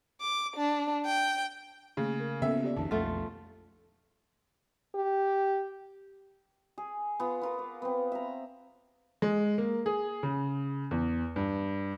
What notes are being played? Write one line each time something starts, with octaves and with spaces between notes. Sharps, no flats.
D6
D4
G5
C#3 A3 A#3 G#4
A#4
C#3 A#3 B3 C#4 A4 E5
G4 D5
A#1 F2 D#3 A5
B1 F2 A3 F4 A4 F#5
G4
G#4
B3 F4
B3 F4 A#4
D6
B3 C4
E5 A#5
G#3
A#3
G#4
C#3
E2
G2